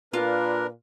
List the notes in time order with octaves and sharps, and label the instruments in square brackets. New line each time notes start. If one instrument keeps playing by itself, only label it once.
[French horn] A#2 [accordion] D4 A#4 [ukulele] F4 [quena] B4